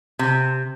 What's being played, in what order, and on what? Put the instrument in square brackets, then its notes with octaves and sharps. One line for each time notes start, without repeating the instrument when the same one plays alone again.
[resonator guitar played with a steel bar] C3